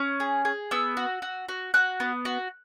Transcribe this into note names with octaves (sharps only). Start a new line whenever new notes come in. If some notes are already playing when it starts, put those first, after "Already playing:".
Already playing: C#4
G#4
G#4
B3 E6
F#4
F#4
F#4
F#4 F#6
B3
F#4